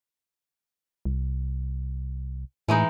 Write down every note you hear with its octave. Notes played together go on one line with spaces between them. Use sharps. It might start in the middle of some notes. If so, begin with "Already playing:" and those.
C2
A2 E3 G#3 D#4